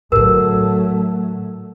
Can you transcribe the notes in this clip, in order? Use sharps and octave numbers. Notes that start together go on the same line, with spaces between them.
A2 D3 F#3 A3 A#4